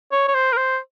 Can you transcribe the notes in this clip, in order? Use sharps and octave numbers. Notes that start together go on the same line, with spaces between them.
C#5
C#5
C5
A#4
C5